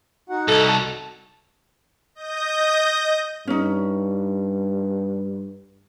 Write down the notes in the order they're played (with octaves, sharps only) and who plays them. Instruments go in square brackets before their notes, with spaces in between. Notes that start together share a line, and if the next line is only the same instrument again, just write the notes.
[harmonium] D#4 F#4 F#5
[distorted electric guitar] C2 [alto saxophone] A4
[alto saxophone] A5
[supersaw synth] D#5 D#6 G6 A#6
[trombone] G2 [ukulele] C#4 D#4